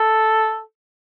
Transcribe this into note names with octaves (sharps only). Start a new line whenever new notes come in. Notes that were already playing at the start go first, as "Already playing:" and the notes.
Already playing: A4